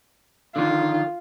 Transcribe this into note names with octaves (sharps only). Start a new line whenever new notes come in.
D3 D#3 F4